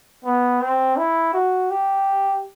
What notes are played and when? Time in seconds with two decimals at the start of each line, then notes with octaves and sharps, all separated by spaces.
0.24 B3
0.61 C4
0.97 E4
1.34 F#4
1.70 G4